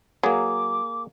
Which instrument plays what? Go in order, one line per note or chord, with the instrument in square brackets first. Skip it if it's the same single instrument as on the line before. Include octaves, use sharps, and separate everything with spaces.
[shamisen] F#3 [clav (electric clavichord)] A#3 G#4 [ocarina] D6